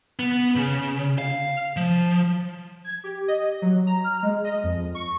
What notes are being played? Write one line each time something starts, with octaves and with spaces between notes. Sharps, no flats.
B3
C#3
F5
F3
G#6
G4
D#5
F#3
A#5
F6
G#3
D#5
F2
C#6